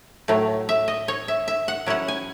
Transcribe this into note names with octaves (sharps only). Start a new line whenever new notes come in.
A2 F#3 A3
E5
D#5
C#5
E5
E5
F#5
F#3 C#4 E4 F#5
G#5